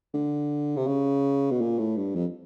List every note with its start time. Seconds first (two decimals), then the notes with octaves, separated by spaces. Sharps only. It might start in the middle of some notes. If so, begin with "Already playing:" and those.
0.14 D3
0.77 C3
0.87 C#3
1.51 B2
1.61 A#2
1.79 A2
1.97 G2
2.15 F2